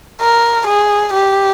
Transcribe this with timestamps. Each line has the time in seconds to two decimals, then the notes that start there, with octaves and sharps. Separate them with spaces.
0.21 A#4
0.67 G#4
1.14 G4